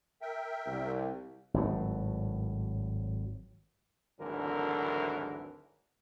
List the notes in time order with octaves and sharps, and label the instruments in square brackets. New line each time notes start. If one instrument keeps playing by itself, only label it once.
[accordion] A#4 E5 G5
[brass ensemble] C2
[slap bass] G#1 A2 F#3
[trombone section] G#1 D2 D3 E3 F#3 A#4